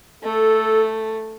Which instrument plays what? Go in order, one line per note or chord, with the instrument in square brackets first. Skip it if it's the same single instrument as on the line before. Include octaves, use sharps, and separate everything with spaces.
[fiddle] A3 [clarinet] A4